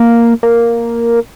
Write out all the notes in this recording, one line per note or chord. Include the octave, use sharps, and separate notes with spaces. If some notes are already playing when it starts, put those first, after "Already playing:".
Already playing: A#3
A#3